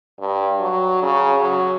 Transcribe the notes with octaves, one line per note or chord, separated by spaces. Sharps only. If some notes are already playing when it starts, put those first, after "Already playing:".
G2
F#3
C#3
F#3